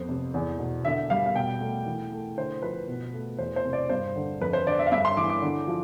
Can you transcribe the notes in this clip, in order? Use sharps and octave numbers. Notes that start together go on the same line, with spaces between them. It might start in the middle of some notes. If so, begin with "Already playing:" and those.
Already playing: F2 B3 C5
C3
E2
B2
D3 E5
G3 F5
F5
B2 G5
A3
E3
A3
D3 C5
F3 B4
B2
A3
E2 C5
C5
C3
D5
G2 C5
D3
F2 B4
C5
D3 D5
E5
F5
G2 E5
C6
E3 D6
D6
D3
F3